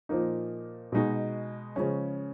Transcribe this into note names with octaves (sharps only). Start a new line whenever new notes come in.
A#2 F3 A#3 D#4
B2 G#3 D#4 F#4
C#3 F3 G#3 C#4